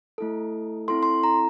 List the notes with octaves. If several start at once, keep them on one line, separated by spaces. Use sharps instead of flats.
A3 E4 A4
C4 E4 A4 C6
C6
A#5